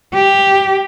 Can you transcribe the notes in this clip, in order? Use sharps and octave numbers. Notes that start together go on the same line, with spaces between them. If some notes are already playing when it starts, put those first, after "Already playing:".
G4